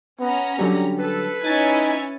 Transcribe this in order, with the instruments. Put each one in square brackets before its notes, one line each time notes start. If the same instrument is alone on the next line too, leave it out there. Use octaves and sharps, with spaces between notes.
[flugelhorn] B3 [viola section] C#4 A#5
[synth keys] D3 F#3 G3 [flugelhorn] G4
[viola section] A4 [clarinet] B4
[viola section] C#4 E4 G#5 [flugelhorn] D#4 [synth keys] A6